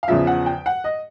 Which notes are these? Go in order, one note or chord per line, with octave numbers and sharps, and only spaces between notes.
F5
E2 C#3 F3 E5
F#5
G5
F#5
D#5